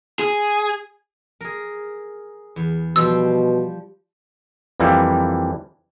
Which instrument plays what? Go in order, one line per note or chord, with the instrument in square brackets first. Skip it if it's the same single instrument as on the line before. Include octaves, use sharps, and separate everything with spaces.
[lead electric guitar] G#4
[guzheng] G#4 A#4
E2
[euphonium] B2 [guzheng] F3 G3 C5 [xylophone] E6
[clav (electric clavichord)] F2 E3 G3 A#3 E4